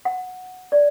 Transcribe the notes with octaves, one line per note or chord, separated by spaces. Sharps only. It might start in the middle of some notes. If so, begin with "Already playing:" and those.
F#5
D5